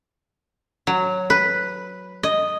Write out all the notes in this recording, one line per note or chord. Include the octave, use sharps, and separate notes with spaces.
F#3
B4
D#5